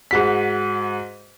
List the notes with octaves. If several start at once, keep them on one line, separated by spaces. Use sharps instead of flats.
G#2 F#4 B6